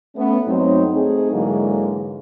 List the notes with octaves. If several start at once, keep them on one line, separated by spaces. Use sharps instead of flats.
A3 B3 C#4
G2 F#3 A3 C4 D#4
A3 C4 D#4 G#4
G#2 D3 E3 F#3 G#3 A#3